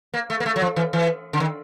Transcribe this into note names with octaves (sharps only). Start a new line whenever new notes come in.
A#3
A3
A#3
A3
F#3
F3
E3
E3
D3
D#3